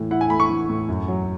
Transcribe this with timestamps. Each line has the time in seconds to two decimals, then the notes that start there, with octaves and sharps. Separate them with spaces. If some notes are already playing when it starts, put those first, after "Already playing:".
Already playing: A2 E3
0.11 E4 F#5
0.21 G#5
0.30 A3 B5
0.40 C#6
0.50 E3
0.69 A2
0.89 F#2
1.08 F#3